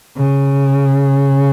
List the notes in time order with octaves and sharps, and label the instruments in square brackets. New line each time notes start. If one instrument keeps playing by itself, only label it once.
[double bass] C#3